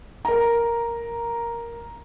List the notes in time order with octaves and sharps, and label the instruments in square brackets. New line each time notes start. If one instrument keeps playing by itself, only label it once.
[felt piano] A#4 A#5